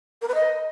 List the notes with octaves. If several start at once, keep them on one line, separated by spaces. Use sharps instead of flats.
A#4
B4
D#5